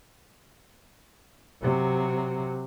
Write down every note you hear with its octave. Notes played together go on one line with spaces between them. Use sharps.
C3 F#3